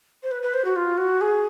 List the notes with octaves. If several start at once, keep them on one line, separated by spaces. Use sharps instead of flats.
C5
B4
B4
C5
F#4
F4
F#4
G#4